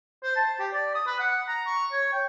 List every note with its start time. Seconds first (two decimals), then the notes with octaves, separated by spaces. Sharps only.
0.23 C5
0.36 A5
0.59 G4
0.73 D5
0.95 D#6
1.07 B4
1.20 F#5
1.49 A#5
1.67 C#6
1.92 C#5
2.13 G5